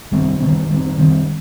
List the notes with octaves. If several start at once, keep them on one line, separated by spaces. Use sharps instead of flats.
D#3 G3 C4
D#3 G3 C4
D#3 G3 C4
D#3 G3 C4